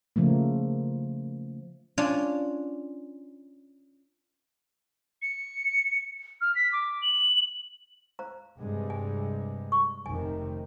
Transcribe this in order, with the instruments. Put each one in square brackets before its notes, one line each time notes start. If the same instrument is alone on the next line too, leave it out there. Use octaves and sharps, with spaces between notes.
[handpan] C#3 F3 A3 A#3
[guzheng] C#4 D4 F4 C#5
[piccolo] C#7
F6
B6
D6
F#7
[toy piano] C5 F5 A#5
[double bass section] G2 C3 G#3
[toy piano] G#5
C#6
[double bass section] F1 C3 D#3 [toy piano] G#5